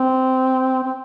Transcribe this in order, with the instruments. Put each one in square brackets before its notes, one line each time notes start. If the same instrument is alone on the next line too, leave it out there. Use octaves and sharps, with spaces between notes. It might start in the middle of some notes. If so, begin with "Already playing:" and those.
Already playing: [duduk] C4
C4